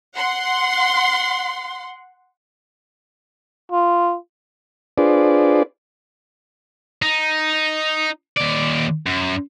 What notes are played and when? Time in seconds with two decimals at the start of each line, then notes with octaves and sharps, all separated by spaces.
0.15 F#5 C6
3.72 F4
4.98 D4 F4 G#4 B4 C5 D5
7.02 D#4
8.38 D#2 D5
9.06 F#2